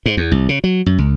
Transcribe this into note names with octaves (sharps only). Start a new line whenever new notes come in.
G#2
E2
C2
C#3
F#3
F#2
C#2